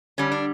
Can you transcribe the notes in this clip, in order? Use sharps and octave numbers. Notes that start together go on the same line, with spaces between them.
D3 G3 C#4
D4